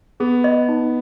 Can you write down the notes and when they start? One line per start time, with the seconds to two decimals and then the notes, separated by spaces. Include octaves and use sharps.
0.20 B3 G#4
0.44 D#5
0.69 D#4